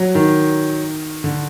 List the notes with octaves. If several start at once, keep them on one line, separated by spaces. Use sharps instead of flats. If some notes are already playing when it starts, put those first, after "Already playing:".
Already playing: F#3
D#3
D3